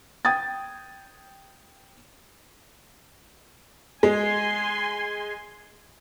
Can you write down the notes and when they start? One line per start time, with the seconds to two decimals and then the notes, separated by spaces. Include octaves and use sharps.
0.25 G5 D#6 G#6 A6
4.03 G#3 G#5 C6